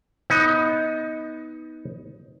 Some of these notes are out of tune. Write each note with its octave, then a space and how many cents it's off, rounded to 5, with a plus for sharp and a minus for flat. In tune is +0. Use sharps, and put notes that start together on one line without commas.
B3 +0 D#4 +20